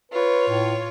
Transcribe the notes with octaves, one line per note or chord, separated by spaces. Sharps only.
F4 B4 C#5
A2